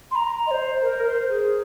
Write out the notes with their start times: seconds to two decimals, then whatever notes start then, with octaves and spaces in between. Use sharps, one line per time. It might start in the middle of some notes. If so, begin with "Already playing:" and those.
0.11 C6
0.15 A#5
0.47 D#5
0.51 C5
0.83 A#4
1.06 C5
1.29 G#4